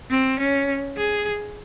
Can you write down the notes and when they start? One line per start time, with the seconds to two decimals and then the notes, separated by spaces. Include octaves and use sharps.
0.10 C4
0.39 C#4
0.97 G#4